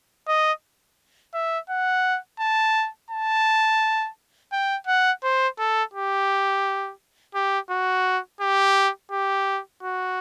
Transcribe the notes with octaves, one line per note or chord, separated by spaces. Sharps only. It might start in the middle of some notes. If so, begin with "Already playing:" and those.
D#5
E5
F#5
A5
A5
G5
F#5
C5
A4
G4
G4
F#4
G4
G4
F#4